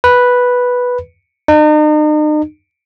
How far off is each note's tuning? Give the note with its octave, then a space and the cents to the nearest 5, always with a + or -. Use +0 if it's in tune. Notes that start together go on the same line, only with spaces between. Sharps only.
B4 -5
D#4 -40